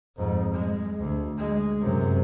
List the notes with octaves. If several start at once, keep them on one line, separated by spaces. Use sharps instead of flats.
F2 G#2
G#3
D2
G#3
F#2 C3